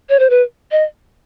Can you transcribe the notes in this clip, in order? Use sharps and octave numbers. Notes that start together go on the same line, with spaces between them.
C#5
C5
B4
D#5